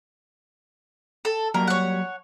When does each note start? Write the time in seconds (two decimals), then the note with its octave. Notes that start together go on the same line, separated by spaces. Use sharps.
1.25 A4
1.54 F#3 G3 A#3 A#4
1.68 C#5 F#5